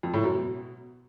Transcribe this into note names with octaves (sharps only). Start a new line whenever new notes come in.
F2
A2
F#2
B2